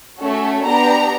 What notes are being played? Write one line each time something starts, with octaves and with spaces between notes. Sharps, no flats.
A3 C#4 F#4 A4
B3 D4 G4 A#5